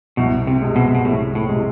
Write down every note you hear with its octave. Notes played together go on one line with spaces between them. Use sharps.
C2 B2
C3
C3 G#3
B2
B2
C2 A2
A2
C3 G#3